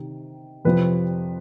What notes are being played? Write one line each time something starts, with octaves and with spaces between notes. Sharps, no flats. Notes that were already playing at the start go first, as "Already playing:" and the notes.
Already playing: C3 D#3
F2 C3 F3 B4